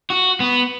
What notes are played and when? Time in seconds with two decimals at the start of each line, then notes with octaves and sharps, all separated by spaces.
0.10 F#4
0.40 B3